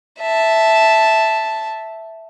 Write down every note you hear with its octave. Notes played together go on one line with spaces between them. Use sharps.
E5 A5